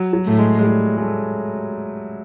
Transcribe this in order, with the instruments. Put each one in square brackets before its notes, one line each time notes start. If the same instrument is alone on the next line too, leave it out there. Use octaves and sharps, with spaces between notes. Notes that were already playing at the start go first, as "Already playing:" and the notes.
Already playing: [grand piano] F#3
F#3
[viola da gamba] A2 [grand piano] A3
[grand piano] G#3
G#3
G3
G#3
A3